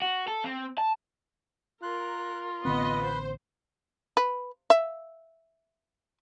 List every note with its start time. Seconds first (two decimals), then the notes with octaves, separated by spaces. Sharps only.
0.02 F#4
0.28 A4
0.44 C4
0.78 A5
1.83 F4 A#4 F#6
2.65 A1 D3 B3 C4 B4 D#5
3.03 C5
4.17 B4
4.70 E5